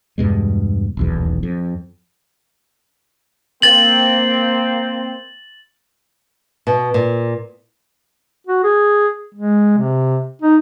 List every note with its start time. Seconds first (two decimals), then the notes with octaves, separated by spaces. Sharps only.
0.18 E2 G2 B2 G#3
0.97 D#1 B1 E2
1.43 F2
3.62 A#3 C4 A6 F#7
6.67 B2
6.94 A#2
8.47 F#4
8.64 G#4
9.35 G#3
9.78 C3
10.42 D#4